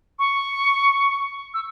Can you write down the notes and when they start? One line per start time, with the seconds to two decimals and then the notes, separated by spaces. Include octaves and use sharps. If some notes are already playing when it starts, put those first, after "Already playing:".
0.19 C#6
1.54 E6